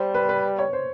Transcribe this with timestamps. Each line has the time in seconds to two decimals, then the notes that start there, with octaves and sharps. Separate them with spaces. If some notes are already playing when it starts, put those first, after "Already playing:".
Already playing: G3 C5
0.14 B4
0.29 B4
0.59 C#5
0.73 C5